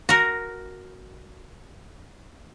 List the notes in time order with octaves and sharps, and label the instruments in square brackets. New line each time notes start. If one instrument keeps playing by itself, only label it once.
[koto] F#4 A#4